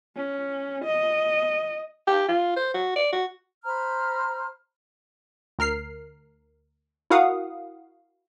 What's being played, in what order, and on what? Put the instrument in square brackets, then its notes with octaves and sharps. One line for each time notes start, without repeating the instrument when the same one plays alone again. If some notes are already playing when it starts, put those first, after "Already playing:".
[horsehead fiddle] C#4
D#5
[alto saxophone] G4
F4
C5
F#4
D5
F#4
[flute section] C5 A#5 B5 F6
[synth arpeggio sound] D2 A#4 F6 C7
E4 F#4 A#4 F5 F#5 D#6